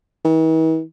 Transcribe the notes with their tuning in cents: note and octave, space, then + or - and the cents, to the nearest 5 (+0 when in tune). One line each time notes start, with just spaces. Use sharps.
E3 -45